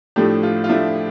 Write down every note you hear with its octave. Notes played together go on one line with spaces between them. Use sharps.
A2 F3 A3 D4 G4
F4
F4
A2 F3 A3 D4 E4